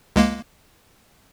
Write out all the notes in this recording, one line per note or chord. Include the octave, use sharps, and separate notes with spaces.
C#2 G#3 A#3